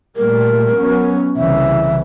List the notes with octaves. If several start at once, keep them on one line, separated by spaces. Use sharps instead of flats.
A#2 G3 A3 A#4
F#3 B3 C#4
C2 C#3 E3 E5